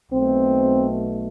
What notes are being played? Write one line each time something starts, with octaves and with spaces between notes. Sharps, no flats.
B1 B2 A3 C4